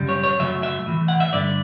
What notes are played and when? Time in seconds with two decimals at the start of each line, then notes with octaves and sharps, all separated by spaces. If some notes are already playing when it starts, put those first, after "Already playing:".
Already playing: F#2 C#3 G3
0.09 C#5
0.23 C#5
0.40 F#2 C#3 F#3 A3 E5
0.63 E5
0.86 A2 E3 A3
1.08 F#5
1.20 E5
1.33 G2 D3 A3 D5